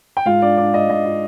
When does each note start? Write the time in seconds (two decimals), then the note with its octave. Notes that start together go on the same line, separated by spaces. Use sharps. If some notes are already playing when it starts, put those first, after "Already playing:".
0.17 G5
0.26 G#2 F4 F5
0.42 D4 D5
0.57 D4 D5
0.74 D4 D#5
0.89 G#2 D#5
1.05 F4